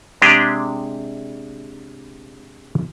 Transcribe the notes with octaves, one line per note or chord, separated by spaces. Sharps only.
C3 G#3 D4 G4 G#4 G5